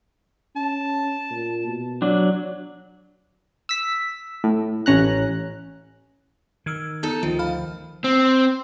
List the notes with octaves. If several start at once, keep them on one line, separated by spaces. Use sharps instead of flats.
C#4 A5
A#2
B2
F#3 D4
E6 B6
A2
A1 C#4 A#5 F#6
D#3 E6 F6 G#6
B3 D#4 A4 A5
D2 D#3 F3 F4
F5 B5 F6
C4